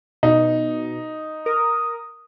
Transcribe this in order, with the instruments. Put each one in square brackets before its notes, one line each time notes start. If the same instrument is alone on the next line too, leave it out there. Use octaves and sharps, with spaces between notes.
[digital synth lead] B2 [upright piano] D#4
[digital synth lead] A#4 [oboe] D#6